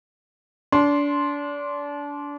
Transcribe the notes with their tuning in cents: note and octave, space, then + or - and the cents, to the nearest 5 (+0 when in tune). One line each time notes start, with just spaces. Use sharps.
D4 -30 C6 +0